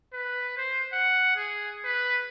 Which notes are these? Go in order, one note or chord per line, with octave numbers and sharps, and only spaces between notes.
B4
C5
F#5
G#4
B4